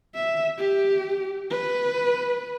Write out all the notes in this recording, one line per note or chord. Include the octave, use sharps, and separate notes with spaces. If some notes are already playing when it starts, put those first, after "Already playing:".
E5
G4
B4